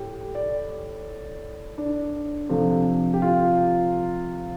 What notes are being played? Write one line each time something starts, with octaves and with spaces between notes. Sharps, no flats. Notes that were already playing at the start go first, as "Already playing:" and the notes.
Already playing: A2 A3 G4
D5
D4
C3 F3 A3
G4
F4